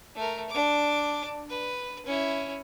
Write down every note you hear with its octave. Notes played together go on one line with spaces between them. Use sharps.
A3 A#4
D4 D6
B4
C#4 E4